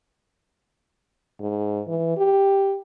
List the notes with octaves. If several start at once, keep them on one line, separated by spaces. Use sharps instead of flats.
G#2
E3
G4